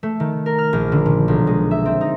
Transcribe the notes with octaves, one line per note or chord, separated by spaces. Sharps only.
A3
D#3
A#4
F6
A#1
D3
A#2
B1
G#3
E5
C4
D#4